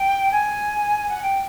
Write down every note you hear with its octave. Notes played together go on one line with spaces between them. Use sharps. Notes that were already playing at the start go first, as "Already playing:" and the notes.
Already playing: G5
G#5
F#5
G5